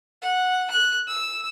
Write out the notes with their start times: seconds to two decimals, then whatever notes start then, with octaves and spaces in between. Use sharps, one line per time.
0.21 F#5
0.71 F#6
1.07 E6